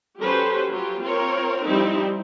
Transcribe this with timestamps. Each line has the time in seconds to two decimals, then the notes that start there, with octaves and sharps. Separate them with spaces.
0.20 F#3 C#4 G4 A4 B4 C5
0.70 F#3 F4 G4
1.02 C4 F4 A#4 C#5
1.66 F3 G3 C4 D#4 E4